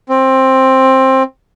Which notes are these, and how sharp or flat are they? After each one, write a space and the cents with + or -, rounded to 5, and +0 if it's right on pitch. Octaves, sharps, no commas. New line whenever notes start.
C4 +15